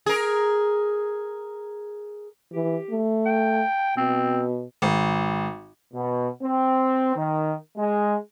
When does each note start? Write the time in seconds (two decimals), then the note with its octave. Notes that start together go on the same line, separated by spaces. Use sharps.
0.06 G#4 A#4
2.53 E3 G4
2.91 A3
3.26 G5
3.97 B2 C4
4.82 G#1
5.94 B2
6.42 C4
7.16 D#3
7.77 G#3